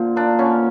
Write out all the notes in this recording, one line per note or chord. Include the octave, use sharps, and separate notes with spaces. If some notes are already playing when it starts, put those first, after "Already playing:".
Already playing: A#2 D3 C5
A#3 D4
D3 C#4